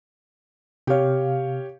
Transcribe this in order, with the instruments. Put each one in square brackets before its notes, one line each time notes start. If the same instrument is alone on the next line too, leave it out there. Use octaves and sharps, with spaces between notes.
[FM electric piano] C3 F5 [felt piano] G4 C#5